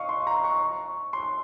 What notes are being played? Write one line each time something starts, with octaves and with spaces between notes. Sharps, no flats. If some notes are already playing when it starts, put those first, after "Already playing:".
Already playing: D#5 F5 C#6
C6
A#5
C#6
C6